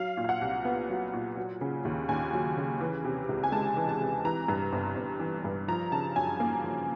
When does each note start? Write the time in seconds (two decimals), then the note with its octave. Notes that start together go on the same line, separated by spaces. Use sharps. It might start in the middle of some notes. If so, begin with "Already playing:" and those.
Already playing: F#3 F5
0.17 A#2
0.24 F5
0.29 F#5
0.41 C2
0.65 B3
0.89 F#3
1.13 A#2
1.37 F#3
1.61 C#3
1.85 D#2
2.09 D#2 G#5
2.33 F#3
2.57 C#3
2.81 E3
3.04 C3
3.29 C#2
3.43 G#5
3.52 G#3 A5
3.76 E3
3.89 A5
4.01 C3
4.25 E3 A#5
4.48 G2
4.73 G1
4.97 G1
5.20 E3
5.44 G2
5.68 F3 A#5
5.92 C#3 A5
6.16 F#2 G#5
6.40 A#3
6.64 F3